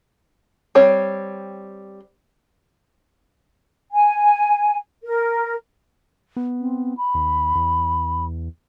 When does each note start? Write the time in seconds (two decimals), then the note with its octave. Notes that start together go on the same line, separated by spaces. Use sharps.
0.75 G3 C4 C#5
3.92 G#5
5.04 A#4
6.36 B3
6.60 C4
6.97 B5
7.14 D#2
7.55 E2